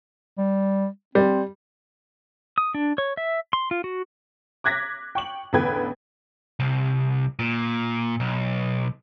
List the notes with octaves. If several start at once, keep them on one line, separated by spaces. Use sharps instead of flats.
G3
G3 C4
D#6
D4
C#5
E5
C6
F4
F#4
D6 F#6 G#6 A#6 B6
G5 C#6 F#7
A1 E2 D3 B4 G5 G#6
C2
A#2
B1